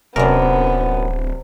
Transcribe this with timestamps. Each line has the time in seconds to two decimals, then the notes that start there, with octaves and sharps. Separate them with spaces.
0.16 D1 F#2 C3 B3 D4 A#4